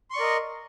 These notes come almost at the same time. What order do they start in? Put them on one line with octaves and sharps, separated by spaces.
C6 C#6 D5 A#4 D#5